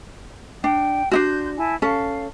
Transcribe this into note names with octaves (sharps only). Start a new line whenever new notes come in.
D4 G5
D4 D#4 F#4 C6 G6
E4 G#5 A5
C#4 A4 F5